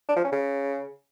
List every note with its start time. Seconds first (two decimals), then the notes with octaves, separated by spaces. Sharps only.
0.08 D4
0.16 F3
0.24 C#4
0.32 C#3